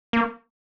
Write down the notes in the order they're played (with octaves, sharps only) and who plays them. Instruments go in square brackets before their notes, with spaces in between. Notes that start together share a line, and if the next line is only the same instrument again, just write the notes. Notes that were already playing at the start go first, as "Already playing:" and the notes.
[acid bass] A#3